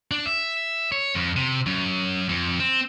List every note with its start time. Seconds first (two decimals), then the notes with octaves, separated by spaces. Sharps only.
0.11 D4
0.26 E5
0.92 C#5
1.15 F2
1.36 C3
1.66 F#2
2.29 F2
2.60 C4